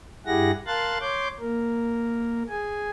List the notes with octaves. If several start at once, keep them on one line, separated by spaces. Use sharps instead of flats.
G2 E4 G4 G#4 F#5 A#6
A#4 F5 A5 C6 F#6 A6
C#5 C6 D6 G6
A#3 A#4
G#4 G#5